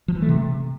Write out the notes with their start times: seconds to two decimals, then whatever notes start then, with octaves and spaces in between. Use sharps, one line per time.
0.08 F3
0.15 E3
0.22 A3
0.29 C3